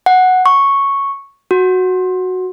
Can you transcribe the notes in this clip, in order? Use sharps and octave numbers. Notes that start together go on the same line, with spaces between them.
F#5
C#6
F#4